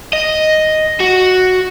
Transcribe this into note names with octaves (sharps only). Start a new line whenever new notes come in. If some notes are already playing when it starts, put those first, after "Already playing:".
D#5
F#4